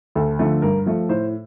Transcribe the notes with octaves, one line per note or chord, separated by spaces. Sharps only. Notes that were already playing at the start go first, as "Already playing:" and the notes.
D2 A4
D3 F3 A3
G2 A#4
F3 A3
A2 C5